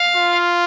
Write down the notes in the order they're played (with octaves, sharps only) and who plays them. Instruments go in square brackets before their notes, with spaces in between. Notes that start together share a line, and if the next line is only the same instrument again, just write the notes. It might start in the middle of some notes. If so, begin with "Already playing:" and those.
Already playing: [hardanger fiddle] F5
[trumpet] F4